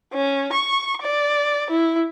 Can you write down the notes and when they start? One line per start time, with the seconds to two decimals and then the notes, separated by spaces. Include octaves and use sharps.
0.14 C#4
0.53 C#6
1.02 D5
1.71 E4